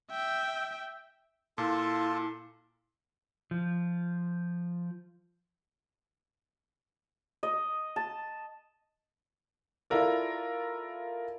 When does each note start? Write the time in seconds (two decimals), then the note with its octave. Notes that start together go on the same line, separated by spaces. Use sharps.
0.11 E5 G5
1.58 A#2 E4 F4 A4 A5
3.51 F3
7.43 D#5
7.96 A5
9.90 E4 F4 A4 A#4 D5